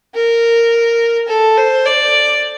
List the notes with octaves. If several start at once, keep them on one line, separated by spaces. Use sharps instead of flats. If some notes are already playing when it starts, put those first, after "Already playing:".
A#4
A4
C5
D5